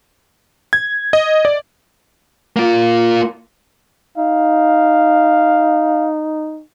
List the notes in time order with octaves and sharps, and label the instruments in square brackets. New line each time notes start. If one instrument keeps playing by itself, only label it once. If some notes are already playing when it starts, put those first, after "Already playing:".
[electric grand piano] G#6
D#5
D5
[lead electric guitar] A#3 F4
[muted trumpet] D#4 [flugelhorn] F5